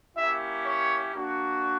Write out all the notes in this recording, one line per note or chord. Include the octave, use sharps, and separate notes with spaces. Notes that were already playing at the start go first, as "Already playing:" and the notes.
A#3 C#4 E4 G4 E5
C#5
A#3 D4 F#4